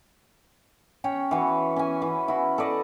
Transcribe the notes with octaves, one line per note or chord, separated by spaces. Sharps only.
C#4 C#5 G5
E3 F#4
C#4 G#5
E3
E4 F#4
A4 B4 D5 D#5